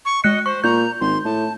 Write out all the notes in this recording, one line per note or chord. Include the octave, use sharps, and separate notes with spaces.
C#6
G#3 D#5 F#6 C#7
C5 C#6
A#2 A#5 G6
G#1 C6
A2 A5